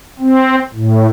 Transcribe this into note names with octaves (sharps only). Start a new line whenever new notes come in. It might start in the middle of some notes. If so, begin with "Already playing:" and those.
C4
A2